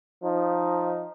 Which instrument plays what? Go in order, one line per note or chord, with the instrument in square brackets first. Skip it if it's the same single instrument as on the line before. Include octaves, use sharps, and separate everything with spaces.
[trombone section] F3 D#4